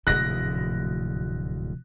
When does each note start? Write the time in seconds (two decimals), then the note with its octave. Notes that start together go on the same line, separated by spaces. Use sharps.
0.07 D1 D2 G#2 C3 F3 F#6 A#6